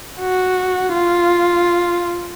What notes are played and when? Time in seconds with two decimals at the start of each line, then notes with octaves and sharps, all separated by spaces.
0.20 F#4
0.94 F4